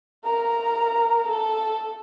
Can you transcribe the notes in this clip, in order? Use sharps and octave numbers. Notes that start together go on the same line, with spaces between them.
A#4 A#5
A4